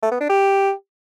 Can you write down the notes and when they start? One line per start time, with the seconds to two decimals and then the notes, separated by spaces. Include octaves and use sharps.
0.03 A3
0.12 B3
0.21 D4
0.30 G4